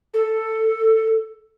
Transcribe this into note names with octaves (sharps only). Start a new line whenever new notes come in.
A4